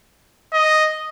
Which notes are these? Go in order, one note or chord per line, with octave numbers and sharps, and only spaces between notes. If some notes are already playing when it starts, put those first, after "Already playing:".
D#5